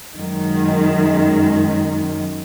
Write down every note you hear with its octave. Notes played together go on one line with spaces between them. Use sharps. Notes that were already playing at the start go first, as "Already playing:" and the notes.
F#2 D#3 G#3